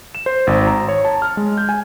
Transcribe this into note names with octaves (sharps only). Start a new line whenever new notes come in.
E7
C5
G#1
A#5
C#5
A5
F6
G#3
G6
G#5